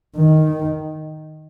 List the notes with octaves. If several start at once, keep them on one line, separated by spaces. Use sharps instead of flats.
D#3